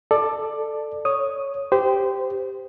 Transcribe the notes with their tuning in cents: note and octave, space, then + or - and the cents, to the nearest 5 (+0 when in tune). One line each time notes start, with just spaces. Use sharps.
A4 +0 D5 +20 D6 +15
C#5 +0 D#6 +0
G4 +0 C5 -25